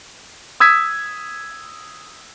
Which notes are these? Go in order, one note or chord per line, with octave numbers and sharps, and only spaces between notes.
D#6 E6 G#6 B6